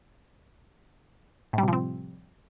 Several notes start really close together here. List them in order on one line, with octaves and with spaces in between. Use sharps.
A2 G3 C3 F3 C4